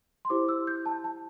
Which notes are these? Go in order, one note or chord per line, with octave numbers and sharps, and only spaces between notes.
C6
E4 G4 C5 D6
E6
G6
A5
A5